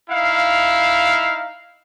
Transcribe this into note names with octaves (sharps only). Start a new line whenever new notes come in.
D#4 E4 F5